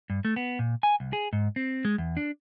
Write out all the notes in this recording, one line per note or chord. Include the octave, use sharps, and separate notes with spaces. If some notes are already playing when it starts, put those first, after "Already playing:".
G2
A3
B3
A#2
G#5
C2
G#4
G#2
C4
G#3
E2
D4